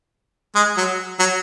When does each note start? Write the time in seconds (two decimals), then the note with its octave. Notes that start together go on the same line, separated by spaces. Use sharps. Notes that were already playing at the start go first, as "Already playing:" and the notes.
0.55 G#3
0.77 F#3
1.20 F#3